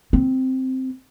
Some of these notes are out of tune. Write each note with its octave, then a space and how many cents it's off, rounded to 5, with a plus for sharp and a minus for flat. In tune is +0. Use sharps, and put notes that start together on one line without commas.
C4 -5